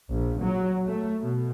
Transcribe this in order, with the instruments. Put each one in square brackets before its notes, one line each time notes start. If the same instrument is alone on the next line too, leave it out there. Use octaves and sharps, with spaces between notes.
[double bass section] A#1
F#3
A3
B2